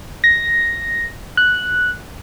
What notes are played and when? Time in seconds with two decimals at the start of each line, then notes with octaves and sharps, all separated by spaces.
0.24 A#6
1.37 F#6